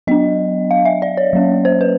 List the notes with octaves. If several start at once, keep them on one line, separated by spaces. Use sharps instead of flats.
F#3 B3 D4 D#5
F5
E5
D5
C#5
F#3 A#3 C#4
C5
B4